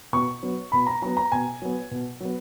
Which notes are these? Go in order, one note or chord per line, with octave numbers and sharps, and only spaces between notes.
B2 C#6
F#3 B3
B2 B5
A#5
F#3 B3 A#5
A#5
B2 G#5
F#3 B3
B2
F#3 B3